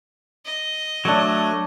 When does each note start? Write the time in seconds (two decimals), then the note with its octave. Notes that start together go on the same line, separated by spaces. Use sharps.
0.45 D#5
1.05 F#3 A3 D4 C#5